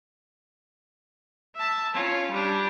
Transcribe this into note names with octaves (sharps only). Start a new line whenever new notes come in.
E5 A5
C#4 F4
G3 D4